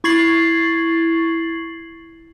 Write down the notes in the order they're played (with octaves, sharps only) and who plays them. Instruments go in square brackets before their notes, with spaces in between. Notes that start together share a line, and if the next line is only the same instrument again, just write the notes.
[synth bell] E4 C#6 G#6 A6 C7 F#7